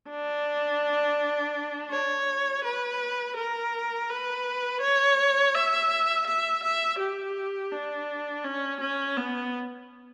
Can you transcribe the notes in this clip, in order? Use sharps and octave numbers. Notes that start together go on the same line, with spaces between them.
D4
C#5
B4
A#4
B4
C#5
E5
E5
E5
G4
D4
C#4
C#4
B3